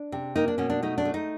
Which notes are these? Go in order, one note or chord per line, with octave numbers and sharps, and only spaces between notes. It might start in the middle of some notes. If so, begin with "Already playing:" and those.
Already playing: D4
C3
A#3 D#4
D4
B2 C#4
D4
A3 D#4
D4
A3
D#4